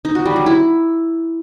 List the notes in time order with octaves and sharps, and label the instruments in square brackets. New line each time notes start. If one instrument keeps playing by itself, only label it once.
[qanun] D#4
F#4
G3
F#3
E4